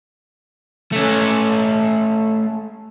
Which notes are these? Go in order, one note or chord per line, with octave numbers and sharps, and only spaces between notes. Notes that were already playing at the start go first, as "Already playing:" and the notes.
A3 C#4